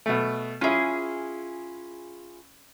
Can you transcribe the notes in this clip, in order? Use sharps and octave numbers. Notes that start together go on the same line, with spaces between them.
B2 A3
C#4 E4 F4 G#4